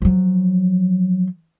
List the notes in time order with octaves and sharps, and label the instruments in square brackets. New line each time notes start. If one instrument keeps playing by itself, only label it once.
[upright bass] F3 F#3